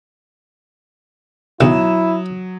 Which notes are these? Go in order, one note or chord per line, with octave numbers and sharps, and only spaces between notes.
B1 F#3 E4 D#6 E7